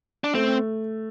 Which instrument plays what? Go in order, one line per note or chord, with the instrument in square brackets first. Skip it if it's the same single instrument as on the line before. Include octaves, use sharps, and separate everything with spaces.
[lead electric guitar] D4
[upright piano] A3 [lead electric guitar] C4